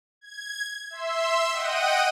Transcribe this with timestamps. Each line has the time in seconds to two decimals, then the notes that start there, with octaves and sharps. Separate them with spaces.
0.21 G#6
0.90 E5 C6 E6
1.52 D#5 F#5 G5 D#7